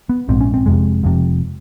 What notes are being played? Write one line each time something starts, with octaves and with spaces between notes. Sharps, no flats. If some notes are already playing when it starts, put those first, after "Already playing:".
B3
A#1 G#2 C4
C#4
C4
F1 F2 C3 G#3
F1 F2 C3